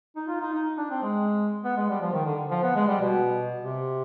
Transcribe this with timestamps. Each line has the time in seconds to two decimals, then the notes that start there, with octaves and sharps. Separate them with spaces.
0.16 D#4
0.28 F4
0.41 D#4
0.53 D#4
0.78 D4
0.91 C4
1.03 G#3
1.65 B3
1.76 G#3
1.90 G3
2.02 F3
2.13 D#3
2.26 D3
2.51 F3
2.63 B3
2.76 G#3
2.88 G3
3.01 B2
3.63 C3